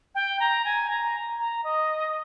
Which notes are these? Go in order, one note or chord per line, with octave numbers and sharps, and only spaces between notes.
G5
A#5
G#5
A#5
A#5
D#5